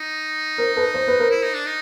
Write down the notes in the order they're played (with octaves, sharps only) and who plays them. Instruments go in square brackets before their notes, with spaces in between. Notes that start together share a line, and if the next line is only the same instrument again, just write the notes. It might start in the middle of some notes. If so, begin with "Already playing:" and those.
Already playing: [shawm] D#4
[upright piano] A#4 C5
A4 B4
C5
B4
A#4 C5
[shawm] E4
D#4
D4
D#4